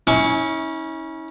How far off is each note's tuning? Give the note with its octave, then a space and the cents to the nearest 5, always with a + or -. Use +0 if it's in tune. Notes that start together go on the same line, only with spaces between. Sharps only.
C#4 +0 E4 -40 C#6 +15